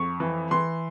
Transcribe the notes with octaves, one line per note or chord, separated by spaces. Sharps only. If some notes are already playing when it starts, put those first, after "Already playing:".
Already playing: F2 C#6
E3
E3 C6